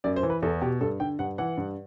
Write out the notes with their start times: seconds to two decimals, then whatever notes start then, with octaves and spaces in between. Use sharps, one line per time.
0.04 F#2 D5
0.16 C5
0.23 E3
0.30 B4
0.42 E2 A4
0.61 B2 G4
0.81 G2 A4
1.00 D3 G5
1.19 G2 F#5
1.38 E3 F#5
1.57 G2